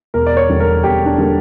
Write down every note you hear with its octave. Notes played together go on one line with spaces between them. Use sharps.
E1 A#4
D5
C#5
E2 D3 G3 A#3
A#4
E1 G4
D4
D3 G3 A#3